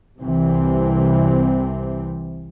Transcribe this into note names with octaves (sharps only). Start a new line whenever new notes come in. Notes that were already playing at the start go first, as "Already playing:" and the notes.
C2 C3 E3 C4